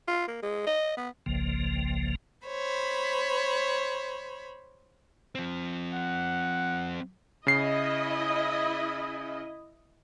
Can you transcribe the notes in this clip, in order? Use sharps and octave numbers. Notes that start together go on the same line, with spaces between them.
F4
A#3
G#3
D#5
B3
G1 C2 C#3 F3 A#3
C5 C#5 B5
F3 C4
F#5
C#3 E4 D#5 C7